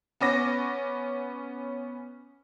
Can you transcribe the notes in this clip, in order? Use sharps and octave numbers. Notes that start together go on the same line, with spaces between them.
B3 C#4 D6 A#6